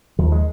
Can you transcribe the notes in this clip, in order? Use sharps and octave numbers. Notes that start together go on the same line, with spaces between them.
D#2 F3
G#3